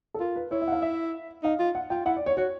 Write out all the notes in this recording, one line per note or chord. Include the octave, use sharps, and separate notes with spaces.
A4
F4 A#4
B4
E4 C#5
E5
F#5
F5
E5
D#4 F5
F4
F#5
F4 G5
E4 F#5
D5
C#5
F#4 C#5